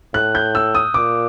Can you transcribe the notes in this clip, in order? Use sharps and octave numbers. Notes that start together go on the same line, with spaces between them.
A2 F#6
G6
E6
D#6
A#2 D6